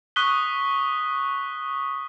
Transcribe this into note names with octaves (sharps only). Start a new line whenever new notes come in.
C#6 D#6 F#6 B6 G7